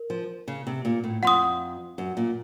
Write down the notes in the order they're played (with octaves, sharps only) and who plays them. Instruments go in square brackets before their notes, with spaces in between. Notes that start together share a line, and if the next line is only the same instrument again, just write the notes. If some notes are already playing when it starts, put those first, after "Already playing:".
Already playing: [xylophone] A#4
[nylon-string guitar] F3
C#3
C3
A#2
A2
[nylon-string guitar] F2 [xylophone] F#5 C6 D#6
[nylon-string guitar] F#2
A#2